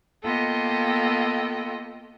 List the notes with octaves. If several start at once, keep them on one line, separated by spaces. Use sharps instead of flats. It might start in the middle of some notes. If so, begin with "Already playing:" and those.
A#3 B3 F4 A4 D#5 G5